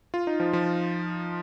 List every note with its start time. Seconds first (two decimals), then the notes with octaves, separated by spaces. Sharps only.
0.14 F4
0.27 D#4
0.40 F3
0.53 F3